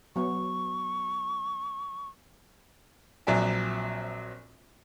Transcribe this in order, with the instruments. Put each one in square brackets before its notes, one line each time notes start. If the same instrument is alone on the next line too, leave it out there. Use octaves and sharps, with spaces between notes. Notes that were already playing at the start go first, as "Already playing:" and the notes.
[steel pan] F#3 B3 [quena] C#6
[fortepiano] A#1 F#3 C4 D5 E5 G#5